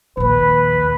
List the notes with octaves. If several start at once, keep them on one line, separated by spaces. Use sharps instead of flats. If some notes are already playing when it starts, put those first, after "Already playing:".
A#1 D#2 B4